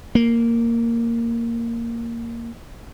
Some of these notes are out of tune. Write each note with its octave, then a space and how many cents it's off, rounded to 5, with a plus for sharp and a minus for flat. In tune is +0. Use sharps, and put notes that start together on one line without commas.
A#3 -5